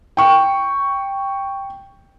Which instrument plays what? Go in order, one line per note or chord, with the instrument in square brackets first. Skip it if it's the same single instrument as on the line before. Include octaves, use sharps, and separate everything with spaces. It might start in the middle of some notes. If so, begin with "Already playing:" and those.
[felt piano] G5 C#6